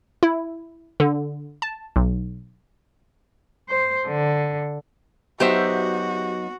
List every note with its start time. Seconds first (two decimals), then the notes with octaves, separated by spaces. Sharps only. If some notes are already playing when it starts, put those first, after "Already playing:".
0.23 E4
1.00 D3
1.62 A5
1.96 B1
3.69 C5
4.08 D3
5.40 F#3 B3 D#4 F#4 G4 C5 E5